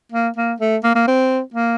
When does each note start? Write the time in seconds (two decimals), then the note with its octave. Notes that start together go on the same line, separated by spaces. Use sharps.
0.12 A#3
0.37 A#3
0.61 A3
0.84 A#3
0.95 A#3
1.08 C4
1.54 A#3